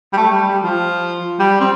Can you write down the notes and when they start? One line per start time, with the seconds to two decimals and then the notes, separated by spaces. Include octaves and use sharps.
0.13 G3
0.17 A3
0.32 G3
0.48 G3
0.63 F3
1.39 G3
1.60 C4